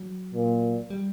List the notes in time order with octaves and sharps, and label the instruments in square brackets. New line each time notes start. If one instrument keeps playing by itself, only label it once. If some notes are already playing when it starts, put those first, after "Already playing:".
Already playing: [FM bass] F#3
[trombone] A#2
[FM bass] G3